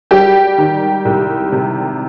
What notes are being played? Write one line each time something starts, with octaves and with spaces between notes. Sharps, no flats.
G3 G4
D#3
C2
C3